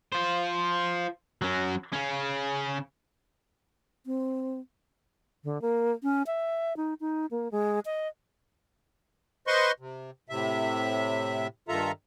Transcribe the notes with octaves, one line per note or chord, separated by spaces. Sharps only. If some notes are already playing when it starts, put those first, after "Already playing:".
F4 C5
F#3 C#4
C#3 C#4
C4
D3
A#3
C#4
E5
D#4
D#4
A#3
G#3
D#5
B4 C5 D#5 C6 C#6
C3
A2 C3 E5
G2 D#3 F4 A4 E5 A#5